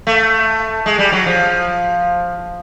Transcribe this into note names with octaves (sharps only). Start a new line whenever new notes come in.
A3
G#3
G3
F#3
F3